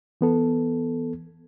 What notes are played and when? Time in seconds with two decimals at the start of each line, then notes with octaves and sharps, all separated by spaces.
0.21 E3 B3 A4